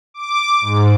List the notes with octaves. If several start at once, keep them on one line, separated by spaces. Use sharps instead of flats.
D6
G#2